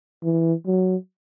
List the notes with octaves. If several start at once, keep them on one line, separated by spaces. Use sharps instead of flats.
E3
F#3